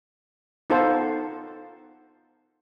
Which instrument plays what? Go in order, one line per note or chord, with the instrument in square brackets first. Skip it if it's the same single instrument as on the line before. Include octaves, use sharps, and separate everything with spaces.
[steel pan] B3 D#4 F4 A4 C5